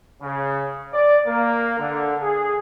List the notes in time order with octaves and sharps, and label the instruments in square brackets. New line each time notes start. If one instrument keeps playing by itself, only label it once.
[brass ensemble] C#3
D5
A#3
D3
G#4